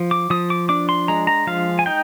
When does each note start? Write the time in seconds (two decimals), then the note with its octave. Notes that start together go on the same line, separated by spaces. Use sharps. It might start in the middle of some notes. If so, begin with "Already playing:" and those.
Already playing: F3
0.11 D6
0.30 F3 D#6
0.50 D6
0.69 D4 D6
0.89 C6
1.08 G#3 A#5
1.27 A#5
1.47 F3 F5
1.79 G#5
1.86 D#4 G5